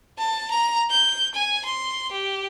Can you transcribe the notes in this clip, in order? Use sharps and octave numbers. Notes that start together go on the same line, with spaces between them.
A5
A#5
G6
G#5
C6
G4